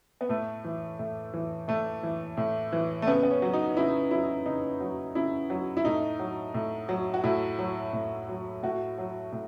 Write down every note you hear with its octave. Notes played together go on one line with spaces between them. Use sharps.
B3
A2 A3
E3
A2
E3
A2 A3
E3
A2
E3
A3
C#3 B3
B3
C#4
F#3
D#4
C#3 E4
F#3 E4
C#3 D#4
F#3
C#3 E4
F#3
E4
A2 D#4
F#3
A2
F#3
F#4
A2 E4
F#3
A2
F#3
A2 F#4
F#3
A2